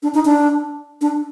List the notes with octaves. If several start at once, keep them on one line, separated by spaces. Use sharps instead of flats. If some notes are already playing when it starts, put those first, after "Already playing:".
D4
D#4
D4
D4